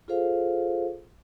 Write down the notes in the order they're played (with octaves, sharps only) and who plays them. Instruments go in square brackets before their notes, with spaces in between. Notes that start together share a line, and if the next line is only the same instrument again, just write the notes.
[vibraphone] F4 G#4 A4 C5 F5